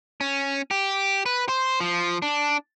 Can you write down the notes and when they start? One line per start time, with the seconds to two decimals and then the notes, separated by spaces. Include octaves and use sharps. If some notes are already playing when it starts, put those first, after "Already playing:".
0.21 C#4
0.71 G4
1.26 B4
1.48 C5
1.81 F3
2.22 D4